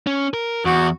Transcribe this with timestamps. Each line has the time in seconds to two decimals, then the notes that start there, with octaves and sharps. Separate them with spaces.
0.07 C#4
0.34 A#4
0.65 E2 F#4